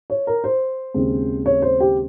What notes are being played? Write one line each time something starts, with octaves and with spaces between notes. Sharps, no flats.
C#5
A#4
C5
D#2 C#3 G#3 C4
C#5
C5
G4